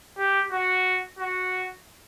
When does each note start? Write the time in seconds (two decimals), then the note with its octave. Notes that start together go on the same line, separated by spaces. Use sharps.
0.18 G4
0.52 F#4
1.19 F#4